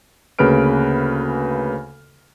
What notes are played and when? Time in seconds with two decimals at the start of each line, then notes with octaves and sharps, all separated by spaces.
0.39 D2 C#3 A#3 B4 F6 D7